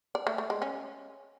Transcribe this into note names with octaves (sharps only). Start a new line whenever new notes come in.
D5
A3
A3
G#3
C#4